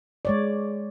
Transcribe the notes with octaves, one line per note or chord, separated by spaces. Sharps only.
G#3 C#5 D5